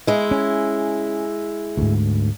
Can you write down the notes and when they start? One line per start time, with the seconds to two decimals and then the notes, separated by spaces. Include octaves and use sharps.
0.07 G#3 E4
0.31 C#4
1.77 D2 G#2